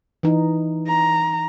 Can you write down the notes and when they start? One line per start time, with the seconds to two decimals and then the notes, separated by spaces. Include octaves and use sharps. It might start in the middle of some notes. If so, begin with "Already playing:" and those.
0.23 E3 D#4
0.88 A#5